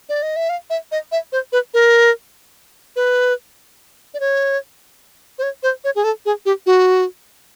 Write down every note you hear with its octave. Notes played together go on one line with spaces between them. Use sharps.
D5
D#5
E5
F5
E5
D#5
E5
C5
B4
A#4
B4
D5
C#5
C5
C#5
C5
C#5
G#4
A4
G#4
G4
F#4